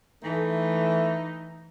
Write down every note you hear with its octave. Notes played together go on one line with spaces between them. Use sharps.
E3 A3 D#4